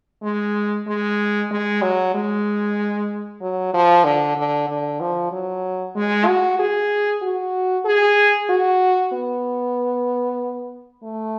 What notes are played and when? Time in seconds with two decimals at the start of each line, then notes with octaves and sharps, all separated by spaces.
0.23 G#3
0.87 G#3
1.51 G#3
1.82 F#3
2.15 G#3
3.41 F#3
3.73 F3
4.04 D3
4.36 D3
4.69 D3
5.00 F3
5.32 F#3
5.95 G#3
6.26 F#4
6.59 G#4
7.22 F#4
7.85 G#4
8.49 F#4
9.13 B3
11.04 A3